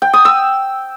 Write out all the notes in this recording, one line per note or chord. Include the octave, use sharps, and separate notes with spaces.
G5
D#6
E6